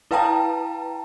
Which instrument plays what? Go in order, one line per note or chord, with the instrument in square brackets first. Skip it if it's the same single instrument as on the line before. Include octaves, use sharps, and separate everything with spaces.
[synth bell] E4 B4 F5 G5 A5 A#5